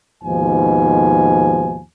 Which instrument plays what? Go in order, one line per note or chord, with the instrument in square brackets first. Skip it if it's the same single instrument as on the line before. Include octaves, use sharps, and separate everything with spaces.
[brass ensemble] D#2 G#2 B2 F3 G#5